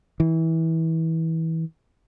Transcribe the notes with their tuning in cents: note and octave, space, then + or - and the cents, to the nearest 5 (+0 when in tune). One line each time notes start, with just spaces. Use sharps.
E3 -25